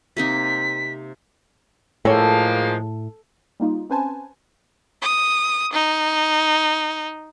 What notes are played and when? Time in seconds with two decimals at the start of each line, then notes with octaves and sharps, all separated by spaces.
0.17 C3 A#3 D#4 B6
2.05 A2 F3 G#3 A#3 G#4 A4 C#5
3.60 G3 A#3 D#4 F4
3.89 C4 C#4 B4 C5 G#5 A5
5.02 D#6
5.73 D#4